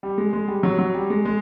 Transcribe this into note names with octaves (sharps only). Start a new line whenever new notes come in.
G3
G#3
G#3
G3
F#3
F#3
G3
G#3
G#3